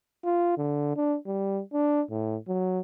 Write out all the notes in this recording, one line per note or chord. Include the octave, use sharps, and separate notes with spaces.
F4
D3
D4
G3
D4
A2
F#3